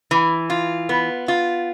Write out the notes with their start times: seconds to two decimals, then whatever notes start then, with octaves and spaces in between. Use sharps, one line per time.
0.11 E3
0.50 F4
0.89 B3
1.28 F4